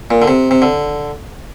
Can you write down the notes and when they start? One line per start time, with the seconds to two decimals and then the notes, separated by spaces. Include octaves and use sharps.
0.11 A#2
0.22 D3
0.28 C3
0.51 C3
0.62 D3